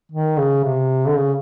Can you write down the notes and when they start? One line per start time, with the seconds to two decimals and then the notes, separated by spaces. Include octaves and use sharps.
0.12 D#3
0.38 C#3
0.65 C3
1.06 D3
1.17 C#3